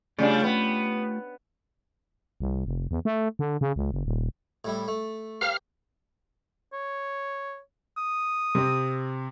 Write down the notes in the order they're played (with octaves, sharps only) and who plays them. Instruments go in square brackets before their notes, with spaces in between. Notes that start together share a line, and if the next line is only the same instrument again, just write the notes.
[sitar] C#3 G3 D4 [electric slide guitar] A3 F4 G4
[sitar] B3
[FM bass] C2
F1
E2
A3
D3
C#3
C#2
F#1
D#1
[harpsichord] A2 G3 E4
A3
[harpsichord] G4 A#4 C5 [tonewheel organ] F5 F6
[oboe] C#5
D#6
[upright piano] C3 C4